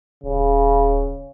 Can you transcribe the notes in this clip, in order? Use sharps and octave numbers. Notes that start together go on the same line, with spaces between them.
D#1 C#3